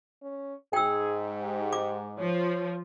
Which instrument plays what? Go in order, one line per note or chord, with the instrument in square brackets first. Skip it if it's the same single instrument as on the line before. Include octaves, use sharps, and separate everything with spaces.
[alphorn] C#4
[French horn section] G#2 [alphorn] G#4 [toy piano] G5 E6
[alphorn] G4
[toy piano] D6
[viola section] F3 [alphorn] C#5